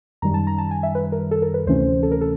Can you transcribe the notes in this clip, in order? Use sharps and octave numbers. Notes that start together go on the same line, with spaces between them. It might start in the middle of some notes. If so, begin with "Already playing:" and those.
F#2 D#3 G3 A#5
A5
A#5
A5
G#5
E5
B4
A#4
A4
A#4
B4
D2 C3 E3 A3 C#4 C5
A4
A#4
A4